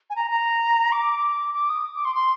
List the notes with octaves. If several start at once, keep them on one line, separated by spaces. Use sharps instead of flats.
G#5
A#5
A#5
D6
D6
D#6
D6
C6
C6